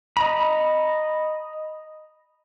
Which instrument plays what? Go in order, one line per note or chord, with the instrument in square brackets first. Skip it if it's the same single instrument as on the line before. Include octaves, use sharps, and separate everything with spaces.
[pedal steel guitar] D#5 A#5 B5